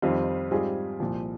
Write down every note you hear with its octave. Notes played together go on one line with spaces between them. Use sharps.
F2 D#3 G3 C4 F4
G#2 G3 C4 F4 G#4
C2 A#2 F3